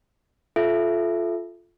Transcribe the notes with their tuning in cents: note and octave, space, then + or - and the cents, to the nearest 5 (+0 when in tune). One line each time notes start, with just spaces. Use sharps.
F4 +0 A4 -20 E5 +10